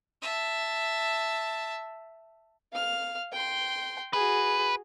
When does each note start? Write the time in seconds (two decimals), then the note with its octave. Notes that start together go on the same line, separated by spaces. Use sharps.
0.22 E5 A5
2.72 F5 F6
3.32 G5 C6
4.13 F#4 G#4 B4